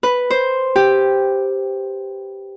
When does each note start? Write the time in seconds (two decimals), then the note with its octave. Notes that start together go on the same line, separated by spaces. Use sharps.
0.03 B4
0.30 C5
0.76 G4